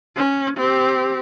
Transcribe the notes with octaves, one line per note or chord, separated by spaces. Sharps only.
C#4
C4 G4